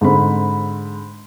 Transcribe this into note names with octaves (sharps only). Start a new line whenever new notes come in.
G#2 D3 C4 B5